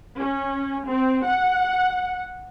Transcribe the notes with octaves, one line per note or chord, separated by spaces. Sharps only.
C#4
C4
F#5